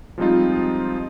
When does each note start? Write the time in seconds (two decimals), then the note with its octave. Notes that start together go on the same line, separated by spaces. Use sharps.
0.18 F3 G3 G#3 C4 D#4 F4